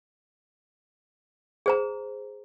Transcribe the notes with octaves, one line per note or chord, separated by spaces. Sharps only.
G#4 C5 A#5